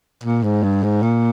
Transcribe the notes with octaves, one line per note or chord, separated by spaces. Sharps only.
A#2
G#2
G2
G#2
A#2